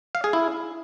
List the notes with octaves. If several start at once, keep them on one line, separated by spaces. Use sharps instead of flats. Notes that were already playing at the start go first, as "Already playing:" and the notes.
F5
G#4
E4